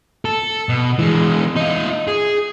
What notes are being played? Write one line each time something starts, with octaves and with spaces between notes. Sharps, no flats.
A4
B2
E3 G#3
D#4 F4
G#4